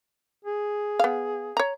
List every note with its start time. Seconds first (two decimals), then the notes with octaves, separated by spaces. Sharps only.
0.45 G#4
0.99 B3 F5
1.57 C#5 A#5